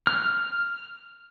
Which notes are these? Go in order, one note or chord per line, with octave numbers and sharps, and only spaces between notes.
F6